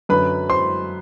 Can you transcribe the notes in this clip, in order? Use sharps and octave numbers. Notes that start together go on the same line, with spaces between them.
F#2 D3 F#3 B4 B5
C5 C6